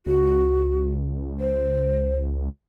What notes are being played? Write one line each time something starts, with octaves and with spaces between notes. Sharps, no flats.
C#2 F#4
C5